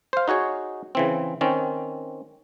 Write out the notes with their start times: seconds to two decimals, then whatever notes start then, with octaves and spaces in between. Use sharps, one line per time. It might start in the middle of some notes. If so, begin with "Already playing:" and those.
0.13 C5 F5
0.28 D#4 F#4 G#4 C#5
0.95 C#3 E3 C4
1.41 D#3 C4 C#4